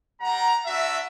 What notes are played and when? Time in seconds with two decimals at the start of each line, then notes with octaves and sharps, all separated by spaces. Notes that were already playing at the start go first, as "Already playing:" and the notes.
0.20 G3 F#5 A#5
0.65 D4 F#4 E5